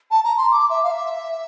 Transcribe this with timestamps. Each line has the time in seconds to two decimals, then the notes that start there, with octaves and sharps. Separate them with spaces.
0.11 A5
0.24 A#5
0.38 C6
0.51 D6
0.70 E5
0.83 F5
0.91 E5